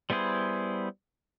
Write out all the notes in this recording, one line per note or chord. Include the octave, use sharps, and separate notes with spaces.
G3 B3 E4 G#4 C5